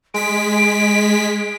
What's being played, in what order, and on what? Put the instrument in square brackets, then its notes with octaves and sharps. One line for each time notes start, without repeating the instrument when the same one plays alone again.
[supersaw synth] G#3 B6 [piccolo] D7